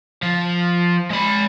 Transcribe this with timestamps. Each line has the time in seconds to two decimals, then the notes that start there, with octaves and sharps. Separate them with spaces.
0.23 F3
1.10 G#3 B5